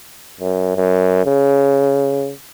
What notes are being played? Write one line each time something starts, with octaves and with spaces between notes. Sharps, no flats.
F#2
F#2
C#3